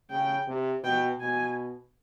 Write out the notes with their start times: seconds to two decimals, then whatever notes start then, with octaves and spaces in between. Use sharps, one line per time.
0.10 C#3 G5
0.47 C3
0.83 B2 G5
1.20 B2 G#5